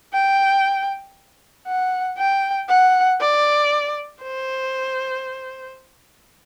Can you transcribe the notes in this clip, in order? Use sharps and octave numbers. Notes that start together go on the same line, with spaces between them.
G5
F#5
G5
F#5
D5
C5